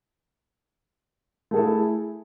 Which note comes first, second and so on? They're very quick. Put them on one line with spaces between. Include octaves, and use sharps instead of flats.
A3 G#4 A4 E4